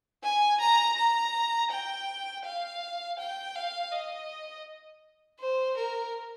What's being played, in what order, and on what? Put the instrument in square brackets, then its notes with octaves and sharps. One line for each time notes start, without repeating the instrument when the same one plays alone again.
[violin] G#5
A#5
A#5
G5
F5
G5
F5
D#5
C5
A#4